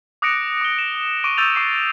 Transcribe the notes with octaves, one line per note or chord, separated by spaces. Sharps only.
D6 D#6 F#6 A#6 C#7 D7
D6 G7
E7
C#6 D6 D7 D#7
C#6 E6 G6 A6 D#7 F7
C#6 D6 C7